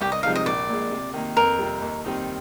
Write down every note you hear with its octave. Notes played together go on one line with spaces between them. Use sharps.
C2 G4
D#5
C3 F3 G#3 D#4 F5
D#5
A#1 D5
A#2 G#3
C3
D#3 A#3
F2 A#4
C3 G3
D#2
D#3 G3 C4 D#4